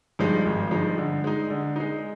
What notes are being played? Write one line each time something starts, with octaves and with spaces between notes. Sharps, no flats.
G2 F3 G#3 D#4
G#1
G2 F3 G#3 D#4
D3
G#3 D#4
D3
G#3 D#4